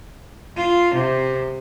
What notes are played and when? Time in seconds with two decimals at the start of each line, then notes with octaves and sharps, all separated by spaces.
0.57 F4
0.94 C3